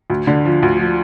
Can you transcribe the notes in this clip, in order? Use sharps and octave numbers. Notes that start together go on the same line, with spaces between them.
D2
D3
F3
D2
F3